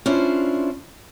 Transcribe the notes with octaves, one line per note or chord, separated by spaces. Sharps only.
C#4 D4 E4 F4 C5